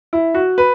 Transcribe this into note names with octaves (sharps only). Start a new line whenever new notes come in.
E4
F#4
B4